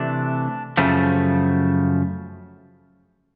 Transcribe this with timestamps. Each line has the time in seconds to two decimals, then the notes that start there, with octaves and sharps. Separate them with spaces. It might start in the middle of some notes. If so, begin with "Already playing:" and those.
Already playing: C3 E3 A3 D4
0.77 F#2 C#3 F3 A3